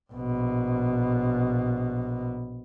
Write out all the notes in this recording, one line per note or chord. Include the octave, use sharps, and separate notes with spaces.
A#1 B2